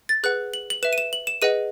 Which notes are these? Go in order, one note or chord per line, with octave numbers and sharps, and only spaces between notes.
A6
G#4 B4 F#5 F#6
F#7
F#7
B4 E5 E7
D#7
E7
F#7
E7
G#4 B4 D#5 F#5 D#7